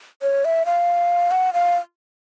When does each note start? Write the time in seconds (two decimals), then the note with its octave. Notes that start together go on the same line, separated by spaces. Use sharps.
0.22 C#5
0.45 E5
0.66 F5
1.31 F#5
1.53 F5